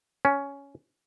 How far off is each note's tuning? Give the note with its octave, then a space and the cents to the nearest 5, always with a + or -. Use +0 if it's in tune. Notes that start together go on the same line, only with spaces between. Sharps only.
C#4 +10